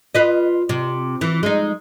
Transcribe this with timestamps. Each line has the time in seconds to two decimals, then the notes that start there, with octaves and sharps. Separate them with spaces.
0.15 F4 B4 D#5
0.69 C3
1.21 E3
1.43 G#3 D#4